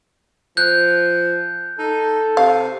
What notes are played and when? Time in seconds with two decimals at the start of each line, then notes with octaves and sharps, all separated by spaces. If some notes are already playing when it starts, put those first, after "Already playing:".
0.57 F3 F#6 G6
1.79 D#4 A4
2.37 C3 F5